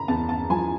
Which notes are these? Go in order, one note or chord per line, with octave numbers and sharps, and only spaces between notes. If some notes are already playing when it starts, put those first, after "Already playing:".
Already playing: C#3 A#5 B5
E2 A5
A5
F3 G#5